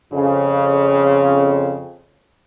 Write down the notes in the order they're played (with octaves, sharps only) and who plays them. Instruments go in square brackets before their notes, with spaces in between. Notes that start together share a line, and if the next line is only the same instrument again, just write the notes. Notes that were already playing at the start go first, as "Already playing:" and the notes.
[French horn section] F2 C#3